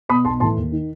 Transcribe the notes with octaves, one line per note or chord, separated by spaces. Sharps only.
B2 B5 D#6
B1 A5 C6
A2 E3 A5 C6
D#2
D#3